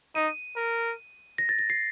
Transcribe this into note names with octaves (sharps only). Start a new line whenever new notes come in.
D#4 D#7
A#4
A#6
A6
A#6
C7